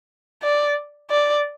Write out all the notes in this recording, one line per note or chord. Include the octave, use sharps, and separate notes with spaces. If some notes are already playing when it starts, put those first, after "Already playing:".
D5
D5